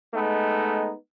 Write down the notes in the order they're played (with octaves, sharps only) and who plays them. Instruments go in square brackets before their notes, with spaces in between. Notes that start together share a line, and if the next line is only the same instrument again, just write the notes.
[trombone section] G#3 A3 B3 D#4